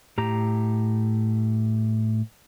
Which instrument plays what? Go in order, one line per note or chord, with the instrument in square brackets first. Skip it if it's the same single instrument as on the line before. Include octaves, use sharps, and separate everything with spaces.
[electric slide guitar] A2 G4 A#5